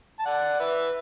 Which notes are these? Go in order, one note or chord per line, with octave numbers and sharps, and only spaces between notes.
A5
D5 F#5
B4 E5